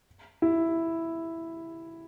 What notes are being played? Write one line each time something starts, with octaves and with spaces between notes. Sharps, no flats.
E4